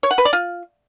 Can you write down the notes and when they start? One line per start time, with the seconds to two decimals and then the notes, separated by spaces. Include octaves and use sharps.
0.03 C#5
0.11 F#5
0.18 B4
0.25 D5
0.33 F4